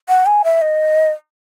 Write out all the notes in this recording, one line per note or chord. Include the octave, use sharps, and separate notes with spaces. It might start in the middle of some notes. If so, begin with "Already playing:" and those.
F#5
G#5
E5
D#5